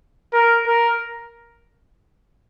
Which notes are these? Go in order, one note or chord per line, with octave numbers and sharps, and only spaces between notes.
A#4
A#4